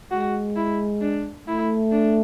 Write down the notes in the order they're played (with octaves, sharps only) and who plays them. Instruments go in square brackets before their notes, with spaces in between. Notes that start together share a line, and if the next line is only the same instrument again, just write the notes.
[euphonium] G#3 [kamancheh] F#4
[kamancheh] E4
D4
[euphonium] A3 [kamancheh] E4
[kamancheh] D4